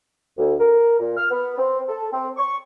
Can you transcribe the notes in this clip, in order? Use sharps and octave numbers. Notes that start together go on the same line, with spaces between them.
D2
A#4
A#2
F6
B3
C4
A4
C4
C#6